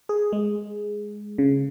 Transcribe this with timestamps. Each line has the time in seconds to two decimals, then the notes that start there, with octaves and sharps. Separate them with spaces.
0.09 G#4
0.32 G#3
1.38 C#3